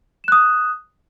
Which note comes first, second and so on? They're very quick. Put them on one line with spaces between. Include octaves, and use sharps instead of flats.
E7 F#6 D#6